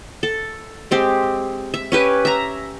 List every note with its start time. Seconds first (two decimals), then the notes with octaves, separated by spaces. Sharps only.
0.23 A4
0.91 G#3 C4 G4
1.74 E5
1.92 C#4 G4 B4 G#5
2.25 E5 A#5